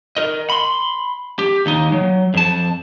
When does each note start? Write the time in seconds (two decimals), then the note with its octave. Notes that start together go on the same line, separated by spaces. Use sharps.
0.17 A#4 D#5
0.50 B5 C6
1.39 G4
1.66 D#2 D#4
1.92 F#3
2.34 F2 A5